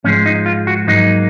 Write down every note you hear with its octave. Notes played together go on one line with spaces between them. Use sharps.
G#2 F3 G#3 C#4
D#4
F4
F#4
G#2 F#3 A#3 D#4